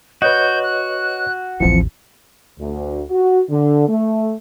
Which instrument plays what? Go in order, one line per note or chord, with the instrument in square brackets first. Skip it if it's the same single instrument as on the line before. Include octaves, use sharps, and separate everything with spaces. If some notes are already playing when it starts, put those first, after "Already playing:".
[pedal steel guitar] F#4 [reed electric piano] B4 C#5 D#5 [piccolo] G6
[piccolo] F#6
[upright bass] A1 D#2 [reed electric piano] E3 F3 C4 [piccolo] C#7
[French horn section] D2
F#4
D3
A3